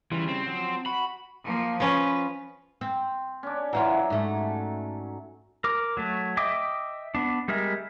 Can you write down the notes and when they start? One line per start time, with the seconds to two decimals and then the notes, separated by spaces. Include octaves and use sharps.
0.12 C#3 E3 G3 F4
0.28 C4
0.46 F3 F#3
0.86 F#4 B5
1.44 F3 A#3
1.80 F3 C#4 B4
2.81 C4
3.43 C#4 D4
3.73 E3 F#3 E4 F4
4.10 G#2 A3
5.64 A#4 D6
5.97 F#3 A3
6.37 D#5 E5 G5 D6 D#6
7.15 B3 D4
7.48 G3 G#3 A#4 E5